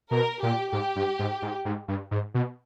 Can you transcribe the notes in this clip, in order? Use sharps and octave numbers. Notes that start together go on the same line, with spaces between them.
B2 A#4
A#2 G4
G#2 G4
G2
G#2
G#2
G#2
G2
G#2
B2